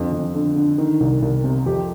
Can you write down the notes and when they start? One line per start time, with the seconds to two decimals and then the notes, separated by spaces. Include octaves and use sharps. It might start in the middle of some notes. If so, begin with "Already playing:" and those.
Already playing: F2 D3
0.12 F2
0.34 D3
0.56 D3
0.78 D#3
1.00 C2
1.22 C2
1.44 C3
1.66 F2 G4